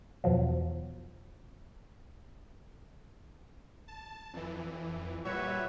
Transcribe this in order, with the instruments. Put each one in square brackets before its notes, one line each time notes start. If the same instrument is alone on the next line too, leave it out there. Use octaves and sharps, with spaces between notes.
[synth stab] E2 B2 F3 F#3
[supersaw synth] A5
F2 E3
[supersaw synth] A#2 G3 E5 [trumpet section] F#4 B4 C#5